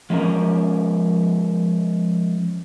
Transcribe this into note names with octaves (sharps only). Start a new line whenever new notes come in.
F3 G#3 C#4 A#4 A#5